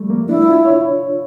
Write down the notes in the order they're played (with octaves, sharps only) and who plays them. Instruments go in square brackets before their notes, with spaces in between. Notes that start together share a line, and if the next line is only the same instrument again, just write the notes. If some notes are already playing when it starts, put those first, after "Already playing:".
Already playing: [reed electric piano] F3 G3 A3
A#3
[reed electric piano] D4 [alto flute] E4
[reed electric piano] F4
C#5